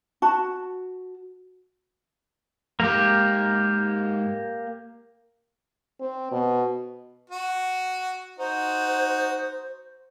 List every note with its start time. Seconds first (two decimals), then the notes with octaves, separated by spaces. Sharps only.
0.22 F#4 A5
2.80 F2 G#2 A#3 G4
6.00 C4
6.32 B2
7.30 F#4
8.38 D#4 F#4 C5